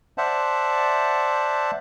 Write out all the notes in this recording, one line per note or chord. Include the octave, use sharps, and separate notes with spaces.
C5 D5 E5 F#5 A5